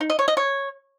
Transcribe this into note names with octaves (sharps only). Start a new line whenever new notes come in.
D#4
D#5
C#5
D#5
C#5